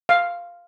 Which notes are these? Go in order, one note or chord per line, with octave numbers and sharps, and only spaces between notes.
F5